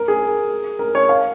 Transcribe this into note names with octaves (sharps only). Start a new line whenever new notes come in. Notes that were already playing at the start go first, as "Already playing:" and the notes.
Already playing: A#4
G#4
A#4
C#5
F5